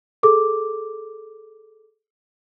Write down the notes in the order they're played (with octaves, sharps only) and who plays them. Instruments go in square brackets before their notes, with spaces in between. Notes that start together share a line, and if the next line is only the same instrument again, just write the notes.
[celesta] G#4 A4 D6